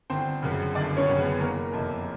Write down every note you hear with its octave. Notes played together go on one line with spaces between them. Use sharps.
G1 C4 C5
F#2 C#3
G1 D4 D5
C#4 C#5
F#2 C#3
B3 B4
F#1 A#3 A#4
F2 C3